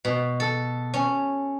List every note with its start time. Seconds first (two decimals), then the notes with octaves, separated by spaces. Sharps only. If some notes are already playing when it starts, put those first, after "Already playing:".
0.05 B2
0.40 A4
0.94 C#4